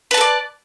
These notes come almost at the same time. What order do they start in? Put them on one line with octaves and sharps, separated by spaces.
B4 A5 A4 D5